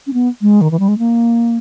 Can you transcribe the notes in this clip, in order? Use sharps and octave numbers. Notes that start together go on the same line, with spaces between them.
C#4
B3
G#3
D#3
E3
G3
G#3
A#3